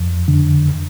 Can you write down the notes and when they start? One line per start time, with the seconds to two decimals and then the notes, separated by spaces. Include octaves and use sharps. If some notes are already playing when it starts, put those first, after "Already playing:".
Already playing: F2
0.28 D3